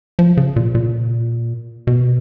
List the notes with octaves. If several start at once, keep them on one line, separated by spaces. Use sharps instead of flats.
F3
C#3
A#2
A#2
B2